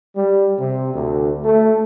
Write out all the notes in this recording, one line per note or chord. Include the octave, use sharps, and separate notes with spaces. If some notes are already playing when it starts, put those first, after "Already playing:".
G3
C3
D2
A3